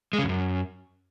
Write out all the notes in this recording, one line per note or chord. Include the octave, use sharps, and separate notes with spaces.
G#3
C#3
F2
F#2